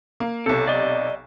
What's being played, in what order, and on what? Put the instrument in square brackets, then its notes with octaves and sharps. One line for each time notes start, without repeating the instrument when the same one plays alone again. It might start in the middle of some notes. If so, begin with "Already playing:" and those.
[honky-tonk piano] A#3
[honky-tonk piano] B1 C3 [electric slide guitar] A4
[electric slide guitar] D5 D#5